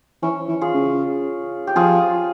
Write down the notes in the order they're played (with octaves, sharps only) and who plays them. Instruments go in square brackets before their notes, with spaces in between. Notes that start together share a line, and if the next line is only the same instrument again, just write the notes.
[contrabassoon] E3 [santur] C#4
[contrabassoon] E3
[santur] F4 G#4
[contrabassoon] C#3
[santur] G4
[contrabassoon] F3 [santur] F4 G#4